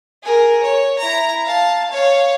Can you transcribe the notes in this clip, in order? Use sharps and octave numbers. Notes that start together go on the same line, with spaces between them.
G#4 A#4
C#5
E4 A#5
F5 A5
C#5 F5